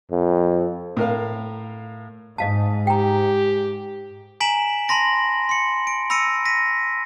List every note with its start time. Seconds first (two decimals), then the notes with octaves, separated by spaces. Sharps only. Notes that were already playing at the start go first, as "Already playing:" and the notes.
0.11 F2
0.97 A2 A#4 F5
2.38 G#2 D#5 F5 A5
2.87 G4 G5 A#5
4.40 G#5 A#5 B6 D7 E7 F#7
4.88 A5 B5 C6 A#6 D7
5.49 C6 C#7
5.87 D7
6.10 B5 E6 A#6 C#7 D#7
6.45 A#6 B6 D#7